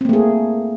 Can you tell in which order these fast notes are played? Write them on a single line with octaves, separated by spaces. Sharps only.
C4 A#3 A3 G#4